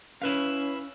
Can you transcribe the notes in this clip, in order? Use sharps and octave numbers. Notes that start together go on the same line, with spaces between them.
C#4 E4 B4 F5